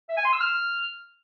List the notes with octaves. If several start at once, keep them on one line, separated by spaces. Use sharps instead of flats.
E5
G#5
C6
E6
F6